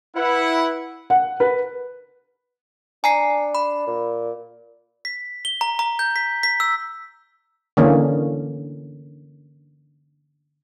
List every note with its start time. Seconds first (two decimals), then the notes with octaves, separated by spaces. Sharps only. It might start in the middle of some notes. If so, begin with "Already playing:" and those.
0.16 E4 B4 F#5
1.10 F#5
1.40 B4
3.04 D4 G#5 A#5 C7
3.55 B5
3.87 A#2
5.05 B6
5.45 G7
5.61 A#5
5.79 A#5
5.99 G6
6.16 B6
6.43 B6
6.60 E6
7.77 D3 E3 A#3 C#4